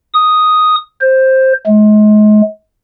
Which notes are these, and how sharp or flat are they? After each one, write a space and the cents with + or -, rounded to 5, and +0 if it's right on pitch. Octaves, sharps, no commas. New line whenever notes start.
D#6 +0
C5 +10
G#3 +35